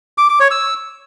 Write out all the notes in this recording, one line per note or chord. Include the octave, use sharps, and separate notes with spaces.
D6
D6
C#5
E6